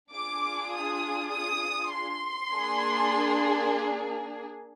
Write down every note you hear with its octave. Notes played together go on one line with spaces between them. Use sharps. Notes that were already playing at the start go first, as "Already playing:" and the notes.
D4 F4 G#4 D6
D#6
D#6
C6
A#3 D4 G#4